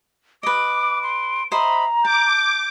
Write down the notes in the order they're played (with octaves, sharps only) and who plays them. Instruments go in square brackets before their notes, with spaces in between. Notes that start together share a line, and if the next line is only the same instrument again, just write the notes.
[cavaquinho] B4 D#5 [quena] D6 [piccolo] D7
[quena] C6
[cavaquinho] C5 D#5 E5 [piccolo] A#5 [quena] B5
[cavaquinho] A5 [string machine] D6 [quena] G6